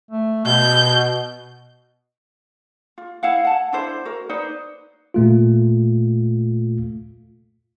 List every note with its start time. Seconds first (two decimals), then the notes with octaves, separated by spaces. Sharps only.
0.11 A3
0.45 B2 G6
2.98 F4
3.23 E4 F5 F#5
3.45 F#5 A5
3.73 D4 E4 C5
4.05 F#4 A#4
4.29 D#4 B4 C5 D5
5.14 A#2 A3 F4